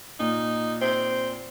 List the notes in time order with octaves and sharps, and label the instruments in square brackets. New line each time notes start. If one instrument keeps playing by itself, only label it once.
[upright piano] A#2 [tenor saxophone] D#4
[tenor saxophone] C4